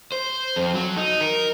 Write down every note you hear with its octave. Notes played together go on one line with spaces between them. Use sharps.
C5
F2
F#3
D#4
A#4